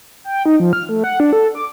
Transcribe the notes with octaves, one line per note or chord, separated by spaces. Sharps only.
G5
D#4
F3
F6
A3
F#5
D4
A4
D6